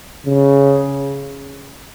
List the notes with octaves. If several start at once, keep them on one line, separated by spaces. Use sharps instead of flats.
C#3